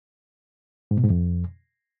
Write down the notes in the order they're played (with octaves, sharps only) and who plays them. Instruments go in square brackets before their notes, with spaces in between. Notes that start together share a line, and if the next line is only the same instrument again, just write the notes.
[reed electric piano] G#2
B2
G#2
F2